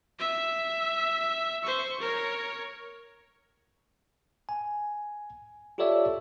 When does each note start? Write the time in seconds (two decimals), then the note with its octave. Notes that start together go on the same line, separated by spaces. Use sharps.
0.20 E5
1.64 C5 C#6
2.01 A#4 C#5
4.49 G#5
5.78 F4 G4 A4 C#5 D5 E5